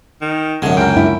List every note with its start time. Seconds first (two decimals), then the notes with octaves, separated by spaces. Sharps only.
0.22 D#3
0.62 C2 F#2 D3 G#3 A3
0.77 C#2 A#4 G5
0.97 E4